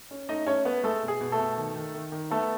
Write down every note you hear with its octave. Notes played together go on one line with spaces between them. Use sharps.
C#4
A3 D#4 D#5
A3 C#4 C#5
A3 B3 B4
G#3 A3 A4
B2
G#4
B2
A3 A4
B2
D#3
D#3
D#3
D#3
A3 B3 A4